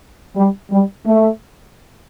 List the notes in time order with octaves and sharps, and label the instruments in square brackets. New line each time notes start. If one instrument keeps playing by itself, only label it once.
[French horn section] G3
G3
A3